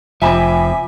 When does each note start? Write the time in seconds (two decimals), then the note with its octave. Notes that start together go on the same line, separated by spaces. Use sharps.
0.22 F1 F3 C4 E5 G#5 B5 D6